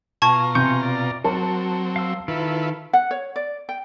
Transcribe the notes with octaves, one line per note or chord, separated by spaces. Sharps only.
B2 F4 A5 A#5 C#6 G#6
C3 G#5 C6 C#6 G6
D5
F#3 C4 F#4 A#4 A5
F5 E6
D#3 E4 F4 A4 B4
F#5
C#5
D5
G5